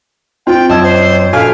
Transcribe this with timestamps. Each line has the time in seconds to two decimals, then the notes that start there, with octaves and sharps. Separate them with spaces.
0.47 C4 F4 G5
0.70 F#2 D#5 A5 E6 G#6
0.83 C5
1.33 A#1 F#4 A4 F5 G#5 F6 D7